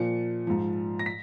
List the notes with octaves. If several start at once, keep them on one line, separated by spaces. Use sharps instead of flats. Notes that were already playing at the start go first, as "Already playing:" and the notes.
Already playing: A#2 F3 C#7
G#2 F3
A#6
B6